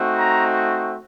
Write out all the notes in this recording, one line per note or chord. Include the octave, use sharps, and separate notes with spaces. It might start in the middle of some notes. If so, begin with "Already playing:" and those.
Already playing: A3 C4 D#4 F#4
A#5